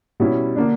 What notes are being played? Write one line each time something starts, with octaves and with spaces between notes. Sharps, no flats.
B2 G3 C#4 E4
D3 A#3 D4